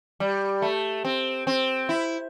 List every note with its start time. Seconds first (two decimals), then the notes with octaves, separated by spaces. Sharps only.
0.20 G3
0.62 A3
1.05 C4
1.47 C4
1.89 E4